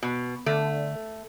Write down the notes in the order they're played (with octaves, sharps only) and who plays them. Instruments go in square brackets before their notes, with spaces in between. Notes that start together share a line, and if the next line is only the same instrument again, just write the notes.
[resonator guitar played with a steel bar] B2
[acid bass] D3 [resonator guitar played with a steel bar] A3